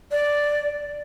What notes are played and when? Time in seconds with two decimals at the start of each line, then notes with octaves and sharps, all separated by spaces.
0.11 D5